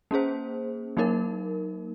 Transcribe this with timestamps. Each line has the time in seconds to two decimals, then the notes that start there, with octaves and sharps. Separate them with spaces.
0.11 A#3 C#4 G#4 C5
0.97 F#3 A#3 D#4 A#4